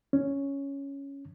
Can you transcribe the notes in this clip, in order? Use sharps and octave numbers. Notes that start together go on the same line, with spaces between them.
C#4